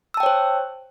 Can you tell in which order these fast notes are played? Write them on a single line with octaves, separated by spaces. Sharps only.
E6 A5 G5 C#5 C5